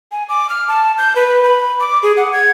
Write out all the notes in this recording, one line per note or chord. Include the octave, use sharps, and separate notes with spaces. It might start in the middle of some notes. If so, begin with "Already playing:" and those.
G#5
D6
F6
A5
G6
B4
B5
D6
G#4
F#5
G#6